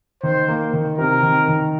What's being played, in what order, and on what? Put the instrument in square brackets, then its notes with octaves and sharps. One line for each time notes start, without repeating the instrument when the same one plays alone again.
[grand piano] D#3 [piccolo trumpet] C5
[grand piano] A#3
D#3
[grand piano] C3 [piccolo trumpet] A#4
[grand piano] D#3
D#3